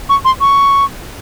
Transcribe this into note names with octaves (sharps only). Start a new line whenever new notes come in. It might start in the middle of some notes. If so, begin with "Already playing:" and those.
C#6
C6
C#6